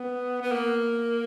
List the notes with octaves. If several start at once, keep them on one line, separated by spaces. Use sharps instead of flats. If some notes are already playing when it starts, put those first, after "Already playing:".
Already playing: B3
B3
A#3